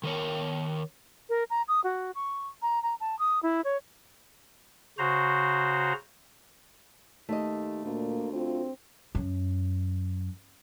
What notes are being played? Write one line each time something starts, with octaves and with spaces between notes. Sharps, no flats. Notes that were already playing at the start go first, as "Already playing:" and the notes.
D#3 A#4 C#5
A#4
A#5
D#6
F#4
C#6
A#5
A#5
A5
D#6
E4
C#5
C#3 F#4 C5 A#5
D#2 A3 D#5
D2 A#2 A#3
C4 F4
F#2